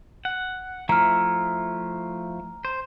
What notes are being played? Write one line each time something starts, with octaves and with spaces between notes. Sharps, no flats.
F#5
F3 A3 E4 A#5 F6
C5